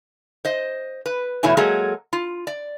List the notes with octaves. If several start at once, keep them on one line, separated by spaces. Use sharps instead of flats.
C5 D#5
B4
E2 B2 A3 E4 C#5 G#5
F#3 G#3 A#3 G#4 A4
F4
D5